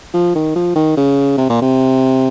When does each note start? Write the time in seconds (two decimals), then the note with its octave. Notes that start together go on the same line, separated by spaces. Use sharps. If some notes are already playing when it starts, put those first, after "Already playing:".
0.14 F3
0.35 D#3
0.55 F3
0.76 D#3
0.97 C#3
1.38 C3
1.49 A#2
1.62 C3